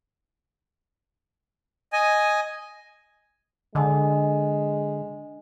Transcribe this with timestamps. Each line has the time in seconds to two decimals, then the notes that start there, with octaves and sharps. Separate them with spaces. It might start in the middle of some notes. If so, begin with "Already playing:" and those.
1.93 D#5 G#5
3.75 D3 G#3 D4 D#5 G#5